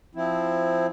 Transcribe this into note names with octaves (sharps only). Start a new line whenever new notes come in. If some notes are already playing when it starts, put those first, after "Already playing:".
F3 C4 E4